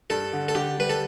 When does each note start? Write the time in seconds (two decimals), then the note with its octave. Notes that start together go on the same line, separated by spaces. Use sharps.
0.10 G2 A4
0.33 D3
0.48 A4
0.55 D3 G4
0.78 G3 B4
0.90 A4